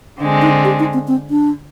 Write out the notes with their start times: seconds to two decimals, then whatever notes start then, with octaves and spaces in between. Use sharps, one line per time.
0.19 D3 G#3 C4 D4
0.42 D#4
0.65 G4
0.79 D#4
0.94 C4
1.08 C4
1.30 D4